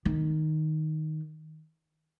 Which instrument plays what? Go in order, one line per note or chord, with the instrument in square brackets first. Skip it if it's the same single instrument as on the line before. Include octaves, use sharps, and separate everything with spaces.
[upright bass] D#3